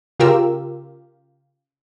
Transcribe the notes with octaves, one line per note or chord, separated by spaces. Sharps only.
C#3 F4 G4 A#4 E6